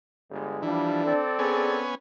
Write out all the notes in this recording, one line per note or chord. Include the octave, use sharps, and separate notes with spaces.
G1 G#3
E3 F3 G3 D4
C4 A4 D5
B3 C#4 G#4 G#5